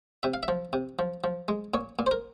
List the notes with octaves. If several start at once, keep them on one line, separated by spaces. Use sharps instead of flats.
C3 E5
F5
E5
F3
C3
F3
F3
G#3
A#2 C#5
A#2
C5
A#4